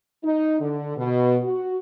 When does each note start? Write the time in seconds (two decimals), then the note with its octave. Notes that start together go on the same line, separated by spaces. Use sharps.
0.24 D#4
0.60 D3
0.97 B2
1.44 F#4